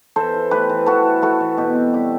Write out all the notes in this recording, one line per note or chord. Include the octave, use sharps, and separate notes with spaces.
E3 A4 C5
E4
A3 G4 B4
E3
E3 F#4 A4
E4
A3 F#4 A4
E3
B2 G4
C4
G3 G4